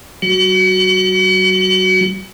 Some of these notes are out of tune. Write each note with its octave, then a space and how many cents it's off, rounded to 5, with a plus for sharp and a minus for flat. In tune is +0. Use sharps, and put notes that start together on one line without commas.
F#3 +45 F#4 +0